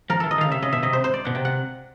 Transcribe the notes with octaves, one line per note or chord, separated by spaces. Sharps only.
F3 A#4
E3 A4
D#5
D#3
C#3 F5
C3 E5
C#3 D#5
B2 E5
C3 D#5
C5
C5
D5
B2 F#5
C3 G5
F#5